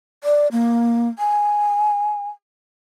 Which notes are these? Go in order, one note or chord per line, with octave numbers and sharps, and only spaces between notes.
D5
A#3
G#5